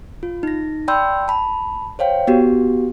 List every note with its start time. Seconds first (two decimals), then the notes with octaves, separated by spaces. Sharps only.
0.23 F4
0.43 D#4 A#6
0.88 D5 G5 B5 C6 E6 G6
1.28 A5 B5
1.99 C5 C#5 F5 G5
2.27 B3 F#4 G4